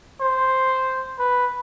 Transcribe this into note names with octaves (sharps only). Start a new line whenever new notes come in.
C5
B4